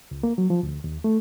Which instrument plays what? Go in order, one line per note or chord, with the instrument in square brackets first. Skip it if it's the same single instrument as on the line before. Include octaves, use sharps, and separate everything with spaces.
[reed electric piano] C#2
A#3
F#3
F3
D2
D#2
A3